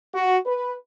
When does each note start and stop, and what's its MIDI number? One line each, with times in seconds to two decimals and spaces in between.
0.13 0.36 66
0.45 0.72 71